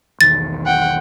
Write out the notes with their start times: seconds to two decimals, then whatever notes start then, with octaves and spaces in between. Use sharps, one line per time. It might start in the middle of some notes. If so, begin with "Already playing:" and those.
0.21 B1 E2 D#3 A6
0.66 F#5 G5